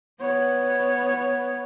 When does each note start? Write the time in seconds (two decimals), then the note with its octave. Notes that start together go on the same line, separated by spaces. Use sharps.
0.20 B3 C#5